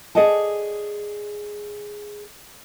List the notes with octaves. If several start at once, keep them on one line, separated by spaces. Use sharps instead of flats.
G#4 D5 D#5 F#5 A5